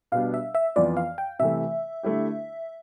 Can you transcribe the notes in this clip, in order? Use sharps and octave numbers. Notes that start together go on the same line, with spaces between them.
B2 G3 B3 D4 G4 F5
E5
E5
F2 E3 B3 F4 D5
F5
G5
C3 E3 A3 E5
D3 A3 E4 G4